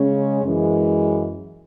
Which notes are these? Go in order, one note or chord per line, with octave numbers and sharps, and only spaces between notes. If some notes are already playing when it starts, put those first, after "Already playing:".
Already playing: C#3 G#3 C#4
F#2 E3 G#3